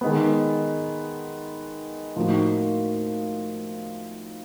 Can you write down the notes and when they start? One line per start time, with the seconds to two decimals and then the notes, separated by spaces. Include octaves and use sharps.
0.01 D#3 G#3 B3
2.16 A2 F3 A#3 D#4 F#4